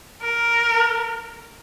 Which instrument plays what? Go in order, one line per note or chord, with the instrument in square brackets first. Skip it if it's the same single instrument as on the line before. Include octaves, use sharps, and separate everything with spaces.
[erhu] A#4